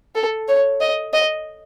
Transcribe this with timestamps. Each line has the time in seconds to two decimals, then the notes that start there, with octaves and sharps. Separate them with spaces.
0.15 A4
0.48 C#5
0.81 D#5
1.13 D#5